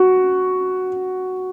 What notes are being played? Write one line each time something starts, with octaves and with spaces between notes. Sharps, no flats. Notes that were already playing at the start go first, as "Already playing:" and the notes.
Already playing: F#4